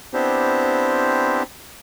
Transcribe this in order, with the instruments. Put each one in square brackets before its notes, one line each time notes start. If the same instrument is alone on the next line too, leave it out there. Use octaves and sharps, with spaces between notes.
[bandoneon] B3 C4 D4 E4 G4 C5